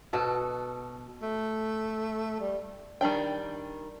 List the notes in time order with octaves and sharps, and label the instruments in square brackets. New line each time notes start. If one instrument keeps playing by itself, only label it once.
[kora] B2 F#4 A4
[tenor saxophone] A3
G3
[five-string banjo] D#3 G3 D4 G5